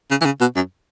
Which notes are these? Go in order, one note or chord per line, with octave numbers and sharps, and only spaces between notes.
C#3
E3
C#3
B2
F#2